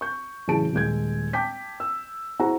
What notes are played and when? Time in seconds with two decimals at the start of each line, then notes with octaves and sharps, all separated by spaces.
0.01 C#6 G6
0.48 A1 C#3 F#3 G#4 A5 D7
0.73 D#1 G#3 G6 G#6
1.33 G5 A5 D6 G6 B6
1.80 E6
2.40 E4 F#4 G#4 C5 F#5 A#5